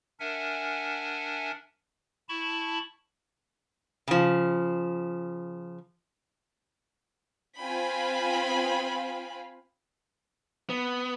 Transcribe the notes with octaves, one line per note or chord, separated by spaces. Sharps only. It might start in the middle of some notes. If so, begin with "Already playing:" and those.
D4 A#4 E5 F#5 G#5
E4 A5 B5 C#6
C#3 F3
C4 F4 F5 G5 G#5 B5
B3